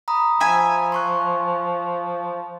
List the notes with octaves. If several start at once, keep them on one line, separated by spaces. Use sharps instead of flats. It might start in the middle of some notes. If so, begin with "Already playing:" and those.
A#5 B5 D#6
F3 E5 G#5
C6 C#6 F#6